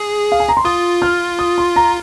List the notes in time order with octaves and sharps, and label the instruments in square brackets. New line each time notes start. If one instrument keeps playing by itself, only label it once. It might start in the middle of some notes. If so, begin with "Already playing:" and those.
Already playing: [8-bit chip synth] G#4
[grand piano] F5
G#5
A#5
C6
[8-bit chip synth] F4 [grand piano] D#6
[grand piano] F6
D#6
C6
A#5